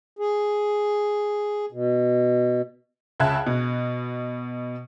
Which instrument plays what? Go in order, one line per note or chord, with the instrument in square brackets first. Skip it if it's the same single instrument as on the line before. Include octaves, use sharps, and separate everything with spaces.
[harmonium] G#4
B2
[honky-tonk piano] C#2 C#3 E5 A5 F#6 G#6
B2